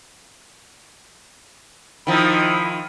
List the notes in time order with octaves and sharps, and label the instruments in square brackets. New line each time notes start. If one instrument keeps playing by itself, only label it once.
[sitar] D#3 F3 [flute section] D#4 E4 B5